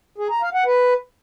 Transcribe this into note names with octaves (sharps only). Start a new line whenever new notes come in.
G#4
A#5
F5
F#5
B4